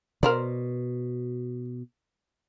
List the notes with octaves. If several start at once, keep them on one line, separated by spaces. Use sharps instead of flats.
B2 A#4 C5 D5